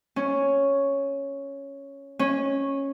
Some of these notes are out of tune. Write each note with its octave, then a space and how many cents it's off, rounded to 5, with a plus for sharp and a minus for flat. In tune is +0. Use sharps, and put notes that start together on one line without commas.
C#4 +0
C#4 -10